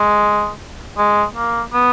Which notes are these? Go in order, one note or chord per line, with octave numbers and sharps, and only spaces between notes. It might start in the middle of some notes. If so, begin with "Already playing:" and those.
Already playing: G#3
G#3
A#3
B3